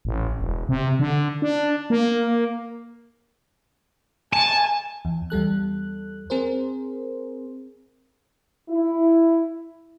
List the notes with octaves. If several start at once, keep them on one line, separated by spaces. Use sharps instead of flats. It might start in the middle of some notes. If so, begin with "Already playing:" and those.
A1
E1
C3
D3
D4
A#3
G#5 A5
E2
E2 G3 A4 F#6
C4 G#4 A#4 C5
E4